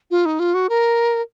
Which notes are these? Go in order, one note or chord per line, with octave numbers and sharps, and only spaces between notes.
F4
D#4
F4
F#4
A#4